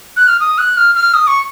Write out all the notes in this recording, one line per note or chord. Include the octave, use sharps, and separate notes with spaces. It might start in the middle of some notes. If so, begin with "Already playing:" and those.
F#6
F6
D#6
F#6
F6
F6
D#6
C#6